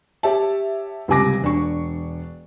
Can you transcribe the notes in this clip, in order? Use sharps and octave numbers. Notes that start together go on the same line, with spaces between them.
G4 C#5 E5 A5
C#2 C3 G3 G#5 D6 A#6
E1 D4 C#6